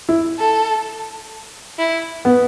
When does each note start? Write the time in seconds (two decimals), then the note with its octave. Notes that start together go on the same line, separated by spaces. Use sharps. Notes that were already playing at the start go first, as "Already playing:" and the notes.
0.09 E4
0.39 A4
1.79 E4
2.25 B3